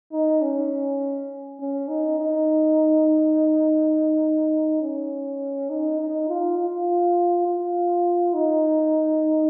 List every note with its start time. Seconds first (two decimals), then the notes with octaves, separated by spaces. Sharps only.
0.12 D#4
0.41 C#4
1.60 C#4
1.88 D#4
2.18 D#4
4.82 C#4
5.70 D#4
6.00 D#4
6.28 F4
6.58 F4
7.47 F4
8.34 D#4